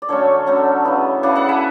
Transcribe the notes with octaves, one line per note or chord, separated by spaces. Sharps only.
D5
D3 F#3 A3 C#4 A4 C#5
D3 F#3 A3 C#4
C#3 E3 B3
C#3 E3 B3 D5 F#5
F#5 A5
E5 G#5